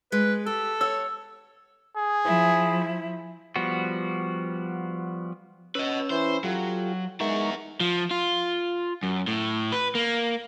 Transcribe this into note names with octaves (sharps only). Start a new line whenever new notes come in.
G#3 B4
G4 A4
C#5 F#5 E6
G#4
F3 E4
F3 G3 B3 F#4
C#4 B4 D#5 E6
E3 C5
F#3 F4 G4 A4
G#3 B3 D#4 A#4 E5 C#6
F3
F4
F#2
A2
B4
A#3